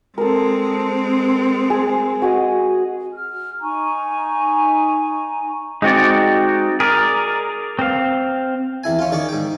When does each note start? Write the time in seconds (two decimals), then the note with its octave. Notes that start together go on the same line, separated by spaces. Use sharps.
0.18 G#3 C4 A4 A#4
1.70 G#4
2.22 F#4 G#4 D#5
3.13 F6
3.61 D#4 G#5 A#5 C#6
5.82 G#3 C4 D#4 F#4 D5
6.80 G#4 A#4 D5
7.79 C4 F5
8.84 E2 E4 G#5
8.99 C#4 F4
9.11 D#3 G#4 D5 C#6
9.29 G#2 G5